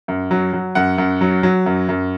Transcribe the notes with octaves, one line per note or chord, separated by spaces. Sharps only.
F#2
F#3
F#3
F#2 F#5
F#2
F#3
F#3
F#2
F#2